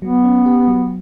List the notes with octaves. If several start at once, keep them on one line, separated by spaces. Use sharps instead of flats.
F#3 B3
C#4
G4
F#3